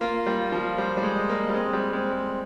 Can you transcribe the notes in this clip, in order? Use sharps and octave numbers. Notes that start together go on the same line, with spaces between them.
A#3 F4
G3
F4
F3
G3 C5
G3
G#3
D#5
A#3
G3
G#3 C4
G3
G#3 C4
G#3